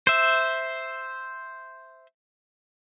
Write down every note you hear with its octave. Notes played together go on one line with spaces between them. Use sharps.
C5 E5